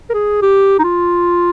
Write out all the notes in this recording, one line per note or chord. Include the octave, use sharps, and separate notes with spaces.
A#4
G#4
G4
D#4
F4